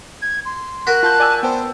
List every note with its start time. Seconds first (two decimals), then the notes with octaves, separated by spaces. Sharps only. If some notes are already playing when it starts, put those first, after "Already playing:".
0.22 G#6
0.45 C6
0.87 F#4 A#4 F#6 B6
1.03 F4 A5 G6
1.20 D5 G#5 E6
1.43 B3 C5 G5 A5